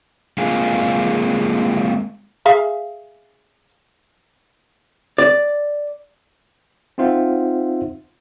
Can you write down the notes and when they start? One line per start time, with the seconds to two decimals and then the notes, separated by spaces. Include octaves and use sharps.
0.38 G#3 A#3 C4 F4 G#4
2.46 G#4 E5 F5
5.18 D5
6.98 C4 D#4 F4 C5 E5 F#5